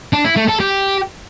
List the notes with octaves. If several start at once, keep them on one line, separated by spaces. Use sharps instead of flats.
D4
E4
A3
A4
G4